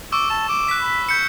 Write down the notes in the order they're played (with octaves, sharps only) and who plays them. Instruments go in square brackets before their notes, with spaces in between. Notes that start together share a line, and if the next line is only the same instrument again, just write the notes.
[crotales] C#6 E6 [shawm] D6
[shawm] A5 [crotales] E7
[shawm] D6
[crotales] F#6 B6
[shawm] B5
[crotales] G6 C#7